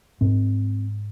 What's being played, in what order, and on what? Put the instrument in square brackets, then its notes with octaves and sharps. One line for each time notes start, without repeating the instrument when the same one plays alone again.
[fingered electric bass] G#2 C4